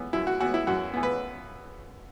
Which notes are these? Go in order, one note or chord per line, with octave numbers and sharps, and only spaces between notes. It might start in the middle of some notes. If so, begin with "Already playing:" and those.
Already playing: E3 B3
F#2 E4
F#4
E3 B3 F#4
E4
F#2 F#4
E3 B3
B4